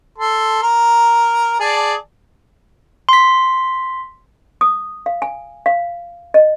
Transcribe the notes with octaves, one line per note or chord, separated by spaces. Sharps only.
A4 C6
A#4
G#4 D5 A5
C6 B6
D#6
F5
G#5
F5
D#5